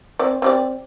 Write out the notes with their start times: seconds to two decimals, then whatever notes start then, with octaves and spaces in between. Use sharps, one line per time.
0.19 C4 D5
0.42 C4 G4 D5